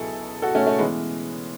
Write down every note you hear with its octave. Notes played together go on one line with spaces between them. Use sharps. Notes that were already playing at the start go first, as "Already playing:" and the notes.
Already playing: C#2 B2 F#3 E4 G#4 A4
F#4 A4
A3 C#4
A3
E3 G#3 B3